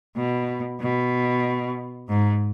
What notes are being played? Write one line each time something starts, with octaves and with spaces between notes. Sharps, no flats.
B2
B2
G#2